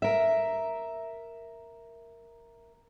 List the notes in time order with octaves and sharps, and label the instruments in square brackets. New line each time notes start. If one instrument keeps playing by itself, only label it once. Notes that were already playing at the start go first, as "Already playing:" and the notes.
[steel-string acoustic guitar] A#4 E5